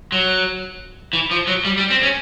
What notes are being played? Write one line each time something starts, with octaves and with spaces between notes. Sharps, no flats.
F#3
E3
F3
F#3
G3
G3
C4
C#4